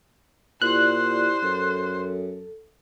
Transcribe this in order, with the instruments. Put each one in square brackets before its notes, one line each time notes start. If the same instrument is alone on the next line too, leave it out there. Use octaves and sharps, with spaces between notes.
[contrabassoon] A#2 [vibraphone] E4 G4 D5 [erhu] C5 [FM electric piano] F#6
[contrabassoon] F#2 [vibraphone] A4